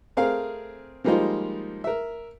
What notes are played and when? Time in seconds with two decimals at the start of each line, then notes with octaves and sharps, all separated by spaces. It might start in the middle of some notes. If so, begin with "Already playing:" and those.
0.17 A3 C4 G#4 A#4 F5
1.04 F3 G3 G#3 A#3 D#4 F4
1.84 A#4 E5